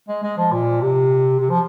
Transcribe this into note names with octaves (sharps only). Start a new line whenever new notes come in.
G#3
G#3
F3
A#2
C3
C3
F3